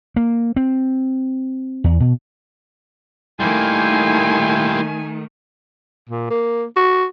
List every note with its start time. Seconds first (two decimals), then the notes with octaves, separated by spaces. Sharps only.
0.16 A#3
0.56 C4
1.84 E2
2.00 B2
3.40 D#3 G3 A3 A#3 E4 G5 G#5 C6
6.09 A#2
6.30 A#3
6.76 F#4